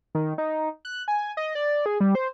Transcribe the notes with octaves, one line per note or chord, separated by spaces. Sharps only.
D#3
D#4
F#6
G#5
D#5
D5
G#4
G3
C5